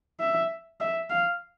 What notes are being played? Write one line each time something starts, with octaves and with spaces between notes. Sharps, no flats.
E5
E5
F5